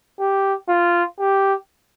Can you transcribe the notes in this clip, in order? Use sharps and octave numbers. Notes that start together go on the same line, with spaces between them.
G4
F4
G4